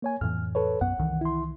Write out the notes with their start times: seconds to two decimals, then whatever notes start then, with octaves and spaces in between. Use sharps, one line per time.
0.02 A#3 C#5 G#5
0.21 F2 A2 E3 F6
0.55 A4 B4 C#5
0.81 B1 F#2 B3 F#5
0.98 C2 D#3 E3
1.21 E4 C6